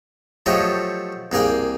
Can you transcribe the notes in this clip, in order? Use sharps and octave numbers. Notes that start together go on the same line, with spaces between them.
F3 F#3 A3 G4 C#5 D#5
C2 A#3 G#4 F5 G5